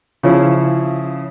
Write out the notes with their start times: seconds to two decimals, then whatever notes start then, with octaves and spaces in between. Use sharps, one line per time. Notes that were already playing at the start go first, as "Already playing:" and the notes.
0.23 C#3 F3 C#4 E4